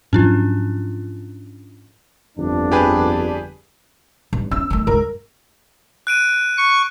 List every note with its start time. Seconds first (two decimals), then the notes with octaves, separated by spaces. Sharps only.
0.13 G#2 F3 F#3 C#4 D4 F4
2.38 G1 F2 D4
2.72 G4 G#4 B4
4.33 G2
4.51 C#4 E6
4.70 D#3 A3
4.87 C#2 G2 A#4
6.07 F#6 D7 D#7
6.57 C#6